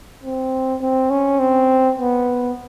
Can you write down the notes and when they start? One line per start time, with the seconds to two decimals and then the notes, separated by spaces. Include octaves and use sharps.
0.23 C4
0.82 C4
1.11 C#4
1.39 C4
1.99 B3